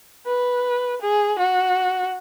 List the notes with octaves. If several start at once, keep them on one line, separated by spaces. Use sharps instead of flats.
B4
G#4
F#4